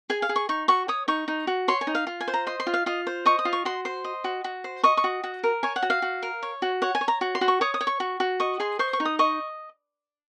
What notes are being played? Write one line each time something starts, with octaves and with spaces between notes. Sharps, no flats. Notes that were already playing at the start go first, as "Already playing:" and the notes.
G#4 G#5
F5
G#4
C#6
D#4 C#6
F#4 C#6
C#5 D#6
D#4 C#6
D#4
F#4
C#5 C6
G#5
D#4
F5
F4
G#5
C5
A#5
D#5 C6
C6
F4
F5
F4 D#5
C5
D#5 C#6
D#6
F4
C#6
F#4 C6
C5 C6
D#5
F#4
F#4
C5
D#5 C#6
C#6
F#4
F#4
A#4
C#5 G#5
F#5
F#4
F5
F#4
A#4
C#5
F#4
C#5 F#5
G#5
C#5
A#5
F#4
C6
F#4
C#6
C#5 D#6
D#6
C#5
C#6
F#4
F#4
D#5 C#6
G#4 C6
C5 C#6
C#6
D#4
D#6
D#5 C#6